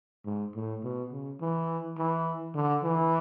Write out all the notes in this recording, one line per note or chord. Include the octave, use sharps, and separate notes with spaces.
G#2
A2
B2
C#3
E3
E3
D3
E3